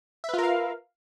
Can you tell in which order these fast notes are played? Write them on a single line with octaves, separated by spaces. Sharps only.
E5 B4 F4 A#4 F5